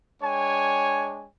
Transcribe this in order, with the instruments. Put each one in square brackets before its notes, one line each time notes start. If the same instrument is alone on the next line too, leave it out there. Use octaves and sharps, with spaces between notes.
[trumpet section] G#3 D4 C#5 G5 G#5